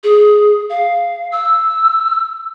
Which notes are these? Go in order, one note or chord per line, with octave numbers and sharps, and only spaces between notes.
G#4
F5
E6